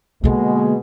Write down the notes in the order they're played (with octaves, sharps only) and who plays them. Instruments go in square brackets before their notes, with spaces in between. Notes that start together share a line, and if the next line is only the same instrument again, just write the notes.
[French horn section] B2 G#3 [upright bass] D3 A#3